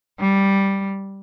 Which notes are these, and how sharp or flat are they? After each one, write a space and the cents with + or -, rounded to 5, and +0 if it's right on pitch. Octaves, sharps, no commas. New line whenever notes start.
G3 +0